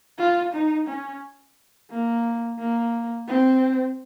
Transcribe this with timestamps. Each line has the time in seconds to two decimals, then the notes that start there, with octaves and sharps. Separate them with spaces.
0.19 F4
0.53 D#4
0.88 C#4
1.91 A#3
2.59 A#3
3.28 C4